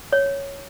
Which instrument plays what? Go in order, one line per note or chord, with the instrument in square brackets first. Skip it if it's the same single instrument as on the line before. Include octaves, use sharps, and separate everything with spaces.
[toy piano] C#5